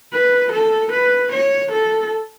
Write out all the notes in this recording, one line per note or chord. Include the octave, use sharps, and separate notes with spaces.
B4
A4
B4
C#5
A4